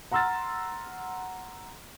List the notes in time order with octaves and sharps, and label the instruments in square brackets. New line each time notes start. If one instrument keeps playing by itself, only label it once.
[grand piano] F#5 A#5 C6 E6 F6 A6